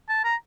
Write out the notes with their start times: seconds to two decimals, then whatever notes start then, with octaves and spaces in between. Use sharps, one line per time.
0.09 A5
0.24 A#5